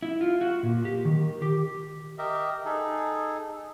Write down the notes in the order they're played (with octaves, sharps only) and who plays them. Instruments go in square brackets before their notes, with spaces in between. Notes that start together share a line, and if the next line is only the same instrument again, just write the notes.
[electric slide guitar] E4
F4
F#4
A#2
G4
D#3
G4
[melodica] G4 A#4 D#5 E5
D#4 G#4 A4